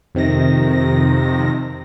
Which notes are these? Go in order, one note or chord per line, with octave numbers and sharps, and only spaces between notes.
F2 C3 D#3 A#6